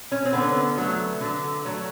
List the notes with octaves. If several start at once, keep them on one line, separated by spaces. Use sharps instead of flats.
C#4
C4
D3 B3
F#3 A3
D3
F#3 A3